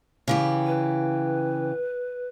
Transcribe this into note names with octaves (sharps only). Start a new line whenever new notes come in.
C#3 E3 G4
B4